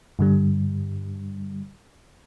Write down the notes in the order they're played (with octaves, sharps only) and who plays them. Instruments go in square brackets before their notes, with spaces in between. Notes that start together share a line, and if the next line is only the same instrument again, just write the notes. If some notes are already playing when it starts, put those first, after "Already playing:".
[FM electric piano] G2 D3 G3